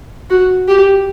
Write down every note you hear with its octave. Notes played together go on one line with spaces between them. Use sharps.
F#4
G4